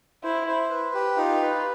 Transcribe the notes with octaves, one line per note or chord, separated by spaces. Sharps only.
E4 C5
C5
B4
G4
D#4 F4
B4